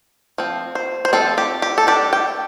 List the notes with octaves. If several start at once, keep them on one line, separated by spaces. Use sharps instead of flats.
F3 C4
C5
C5
F3 C4 A4
G4
G4
A4
G3 D4 G4
G5